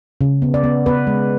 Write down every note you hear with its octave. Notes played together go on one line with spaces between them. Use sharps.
C#3
B3
D5
B3
B3 B4
G#3